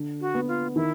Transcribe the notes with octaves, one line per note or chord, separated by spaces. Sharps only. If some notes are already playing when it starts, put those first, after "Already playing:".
Already playing: D3
F#4
B3
F4
D#3 E4